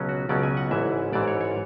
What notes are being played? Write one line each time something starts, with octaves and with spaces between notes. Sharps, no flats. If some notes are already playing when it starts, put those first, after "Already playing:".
Already playing: C#2 B2 F#3 C#4
F#4
C#2 B2 F#3 C#4 D5
G#5
F#5
A1 G#2 E3 E5
A1 G#2 E3 D5
C#5
C#5